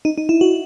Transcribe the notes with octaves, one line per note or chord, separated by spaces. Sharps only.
D#4
D#4
E4
F#4